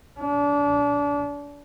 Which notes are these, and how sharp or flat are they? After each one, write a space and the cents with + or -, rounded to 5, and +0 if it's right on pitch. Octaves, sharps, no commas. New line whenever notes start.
D4 -30